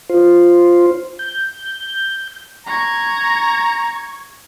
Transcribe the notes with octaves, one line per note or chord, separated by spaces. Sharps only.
F4 C5
G6
A#5 C#6 G#6